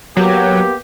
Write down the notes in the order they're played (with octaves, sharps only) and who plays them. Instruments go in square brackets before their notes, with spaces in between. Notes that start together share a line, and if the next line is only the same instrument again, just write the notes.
[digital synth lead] F#3 [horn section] A#3 B3 G4